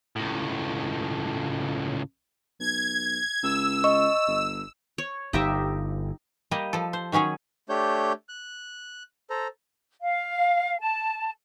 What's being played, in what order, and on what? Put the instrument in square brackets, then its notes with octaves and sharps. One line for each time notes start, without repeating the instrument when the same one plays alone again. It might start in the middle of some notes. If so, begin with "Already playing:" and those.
[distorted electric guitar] C#2 A2
[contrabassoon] B1 [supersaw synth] G#6
[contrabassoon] C#2 [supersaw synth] E6
[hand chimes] D#5 C#6
[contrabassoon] G1
[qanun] C#5
[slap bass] G1 [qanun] D#4 G4 E5
[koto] G3 A#3 G4 D#5
F3 A4
C5
D#3 F#3 C#4 G#4 C#5
[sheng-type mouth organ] A3 D4 G4 C#5 G6
F#6
A4 C5 A#5
[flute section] F5
A5